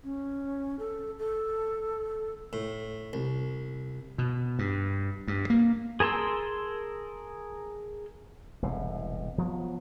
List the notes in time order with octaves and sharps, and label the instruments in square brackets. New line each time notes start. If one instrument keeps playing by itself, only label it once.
[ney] C#4
A4
A4
[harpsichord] A2
C2
[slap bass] B2
G2
G2
A#3
[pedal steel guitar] G#4 A#4 A5 C6 E6
[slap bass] E1 C2 A2
F3 F#3 B3